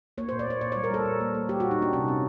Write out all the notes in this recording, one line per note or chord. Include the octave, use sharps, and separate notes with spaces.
A#3 C#5
A#2 C5
D5
A#3 C#5
A#2 D5
G3 C#5
A#4
G3 A4
A#2
A#3
A#3
G3 G4
A#2 F#4
D#4
A#3 D4
C3 C#4
C4